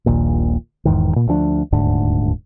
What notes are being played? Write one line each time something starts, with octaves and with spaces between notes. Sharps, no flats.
D#1 A#1 D#2 A#2
E1 E2 G#2 D#3
A#2
D2 F3 C#4 D4
D#1 D2 G#2 D3